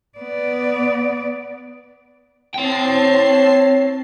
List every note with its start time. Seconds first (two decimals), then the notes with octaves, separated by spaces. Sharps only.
0.18 B3 D5
2.54 C4 C#5 G5 A5 C7